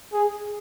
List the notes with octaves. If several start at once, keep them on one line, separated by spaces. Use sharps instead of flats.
G#4